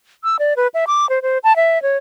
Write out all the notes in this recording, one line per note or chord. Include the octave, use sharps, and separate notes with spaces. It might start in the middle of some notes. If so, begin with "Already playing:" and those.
E6
D5
B4
E5
D6
C5
C5
A5
E5
C#5